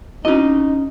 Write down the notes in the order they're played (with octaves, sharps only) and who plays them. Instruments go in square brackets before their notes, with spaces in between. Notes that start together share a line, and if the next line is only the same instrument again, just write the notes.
[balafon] C4 E4 F#4 [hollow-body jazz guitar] C#4 D#5 [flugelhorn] D#4